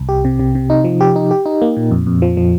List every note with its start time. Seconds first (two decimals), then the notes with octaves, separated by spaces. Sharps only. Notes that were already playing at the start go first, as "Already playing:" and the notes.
Already playing: C2
0.09 G4
0.25 C3
0.39 C3
0.55 C3
0.70 D#4
0.84 F3
1.01 G4
1.16 D#4
1.31 G4
1.46 D#4
1.62 A#3
1.77 A#2
1.91 F2
2.07 F2
2.22 F3
2.37 F3